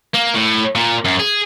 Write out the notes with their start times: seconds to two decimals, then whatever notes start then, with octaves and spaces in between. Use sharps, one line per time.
0.14 A#3
0.35 A2
0.76 A#2
1.05 F#2
1.20 G#4